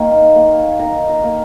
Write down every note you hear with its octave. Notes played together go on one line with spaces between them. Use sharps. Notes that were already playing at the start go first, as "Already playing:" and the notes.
Already playing: D#3 A#3
A#3
D#3 A#5
A#5
A#3